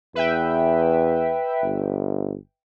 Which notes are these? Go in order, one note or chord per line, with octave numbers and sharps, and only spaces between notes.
E2 B4 E5 G5
G1